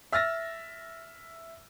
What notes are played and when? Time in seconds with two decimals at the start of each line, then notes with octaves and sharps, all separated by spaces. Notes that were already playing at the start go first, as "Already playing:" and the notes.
0.12 E5 E6 F6 A6 A#6